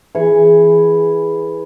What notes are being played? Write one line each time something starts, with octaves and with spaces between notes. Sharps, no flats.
E3 G#4 C#6